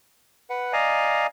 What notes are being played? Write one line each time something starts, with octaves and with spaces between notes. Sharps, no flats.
B4 F#5
D5 D#5 F5 G#5 A#5